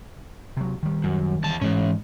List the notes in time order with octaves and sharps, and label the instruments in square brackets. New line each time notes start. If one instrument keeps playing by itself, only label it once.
[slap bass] C3 F#3
D#3 G3
[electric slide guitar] F#2
E2 A5
[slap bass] G#2 [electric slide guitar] E3 C#4